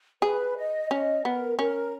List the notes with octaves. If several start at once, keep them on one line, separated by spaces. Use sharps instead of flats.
G#4 B4
D#5
C#4 D#5
B3 A#4
C#4 A#4